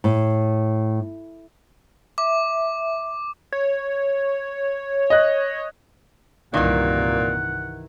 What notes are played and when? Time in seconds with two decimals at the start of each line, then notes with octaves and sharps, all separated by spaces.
0.04 A2
2.18 E5 D6
3.52 C#5
5.10 D#5 F#6
6.54 C2 G2 A#2 D#3 E3 F#5